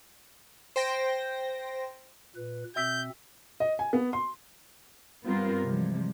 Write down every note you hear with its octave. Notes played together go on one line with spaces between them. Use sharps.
C5 G5 A#6
A#2 B4
B2 C4 E5 E6 G6 B6
D#5
G#5
B3
C6
G2 G3 B3 C4 F4 A#4
C3 E3 F3 G3 G#3